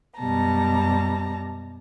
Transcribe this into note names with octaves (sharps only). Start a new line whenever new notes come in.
F#2 B2 G3 A5 A#5